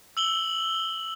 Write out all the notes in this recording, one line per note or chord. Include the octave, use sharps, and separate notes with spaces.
E6 F#7 G7